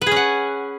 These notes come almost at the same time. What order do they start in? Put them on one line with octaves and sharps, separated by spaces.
B4 G#4 C#4 F#5